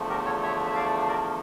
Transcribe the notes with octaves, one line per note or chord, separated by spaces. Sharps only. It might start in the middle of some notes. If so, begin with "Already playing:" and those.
Already playing: E2 D3 F3 A3
G4 A#4
A4 C#5
C#5 E5
E5
D5 F5
A#4 D5